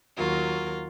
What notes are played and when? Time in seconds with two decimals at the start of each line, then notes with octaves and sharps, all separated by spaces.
0.16 D#2 F#3 F4 A#4